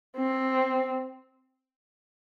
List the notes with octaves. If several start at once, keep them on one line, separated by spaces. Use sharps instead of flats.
C4